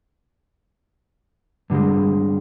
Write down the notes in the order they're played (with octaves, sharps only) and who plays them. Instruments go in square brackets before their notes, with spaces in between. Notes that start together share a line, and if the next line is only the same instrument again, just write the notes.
[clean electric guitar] G2 D3 G3 G#3